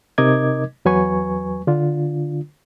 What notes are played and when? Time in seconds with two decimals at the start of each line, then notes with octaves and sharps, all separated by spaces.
0.18 C3 D#4 A#4 D#5 D6 G#6
0.85 E2 F#3 B4 G#5 C#6
1.67 D3 D4 F4